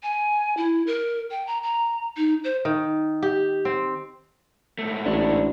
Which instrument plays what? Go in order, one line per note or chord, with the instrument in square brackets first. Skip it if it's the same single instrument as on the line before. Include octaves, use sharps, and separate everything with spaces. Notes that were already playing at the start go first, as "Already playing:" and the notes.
[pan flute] G#5
E4
A#4
G5
A#5
A#5
D#4
C5
[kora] D#3
G4
C4
[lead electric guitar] G#2 A3
[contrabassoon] A1 [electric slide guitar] D4